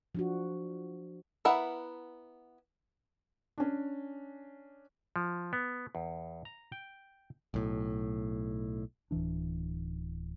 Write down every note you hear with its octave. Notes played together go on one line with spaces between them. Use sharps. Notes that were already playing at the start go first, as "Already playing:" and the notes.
F3 D4 F#4
B3 E4 A#4 F#5
C#4 D4
F3
B3
E2
A#5
G5
B1 A2
D1 G1 E3 D4